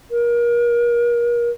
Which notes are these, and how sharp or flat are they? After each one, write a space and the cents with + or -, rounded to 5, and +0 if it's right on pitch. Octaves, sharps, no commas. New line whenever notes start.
A#4 +35